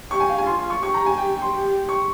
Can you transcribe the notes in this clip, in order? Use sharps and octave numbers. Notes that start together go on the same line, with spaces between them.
G4 C#6
G#5
F5
G#5
F4 C6
C6
C#6
G4 C#6
A#5
G#5
G5
C6
G4
C#6